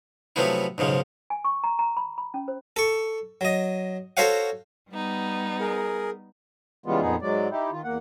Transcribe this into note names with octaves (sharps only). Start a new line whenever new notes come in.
C3 F3 F#3 A3 B3 E4
B1 G#2 C#3 F3
G#5
C#6
A#5
A#5
B5
B5
C#4
C5
A4 C#6
F#3 D#5
F#4 A4 C5 C#5 F5 F#5
G3 B3 D#4
G#4 A#4
C#3 E3 G3 G#3 B3 F4
F2 A#2 B3 D#4 G#4
G#2 F#3 G#3 D5
D#4 E4 G4
D#3 F4
E2 A#3 F#5